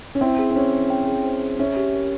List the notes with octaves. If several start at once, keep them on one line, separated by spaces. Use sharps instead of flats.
C#4
C4 E4 G5
G#4
C4
C#4 C5
G#4
G5
G#4
C5
G#4
C#4 E5
G4
A#4